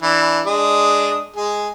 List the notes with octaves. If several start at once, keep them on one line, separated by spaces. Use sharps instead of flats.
E3 D4
G#3 D4 D#6
G#3 G#4